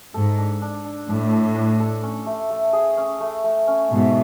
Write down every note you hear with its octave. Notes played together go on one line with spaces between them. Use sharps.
G#2 A4
D4
D4
D4
A2 D4
D4
D4
A4
C#4
A3
A3
G#4
C#4
A3
A3
C#4
G#2 B2 A3